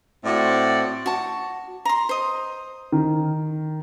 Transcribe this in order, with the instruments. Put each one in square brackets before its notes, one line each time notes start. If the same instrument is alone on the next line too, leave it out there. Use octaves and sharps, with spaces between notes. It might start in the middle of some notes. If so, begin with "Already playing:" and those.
[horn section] A2 C4 F#4 C5 D5
[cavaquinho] F#4 A5
A#5 C6
C5 D#5
[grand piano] D#3